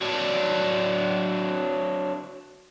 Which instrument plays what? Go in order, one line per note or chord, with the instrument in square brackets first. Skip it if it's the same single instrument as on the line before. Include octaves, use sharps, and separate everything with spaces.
[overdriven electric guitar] F#3 D4